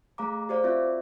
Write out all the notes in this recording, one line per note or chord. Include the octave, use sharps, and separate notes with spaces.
A3 G#4 F5 A#5 D6
G4 C5 D5 F5 D6
C4 F4 F#4 D5 E5